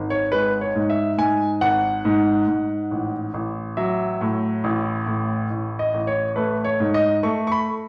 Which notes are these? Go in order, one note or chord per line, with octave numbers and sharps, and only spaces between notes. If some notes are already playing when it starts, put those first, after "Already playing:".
Already playing: G#1
C#5
G#3 B4
C#5
G#2
E5
G#2 G#5
G#1 F#5
G#2
G#2
A1
A1
F#3 E5
A2
A1
A2
A1
D#5
A1
C#5
A3 B4
C#5
G#2
D#5
A3 C#6
C#6
B5